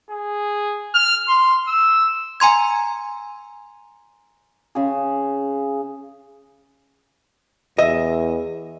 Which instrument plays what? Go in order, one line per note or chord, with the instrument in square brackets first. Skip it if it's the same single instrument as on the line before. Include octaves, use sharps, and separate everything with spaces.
[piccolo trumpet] G#4
F6
C6
E6
[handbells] G#5 A#5 C6 G#6
[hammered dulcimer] C#3 G#4
[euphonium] E2 [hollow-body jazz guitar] D#5 E5